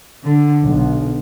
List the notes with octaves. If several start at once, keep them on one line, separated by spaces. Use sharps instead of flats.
D3
B1